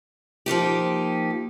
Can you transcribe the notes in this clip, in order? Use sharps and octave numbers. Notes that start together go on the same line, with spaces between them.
F3 A#3 D#4 G4